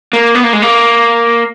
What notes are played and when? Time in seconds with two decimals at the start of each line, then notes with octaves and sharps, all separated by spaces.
0.13 A#3
0.35 B3
0.44 A#3
0.53 G#3
0.62 A#3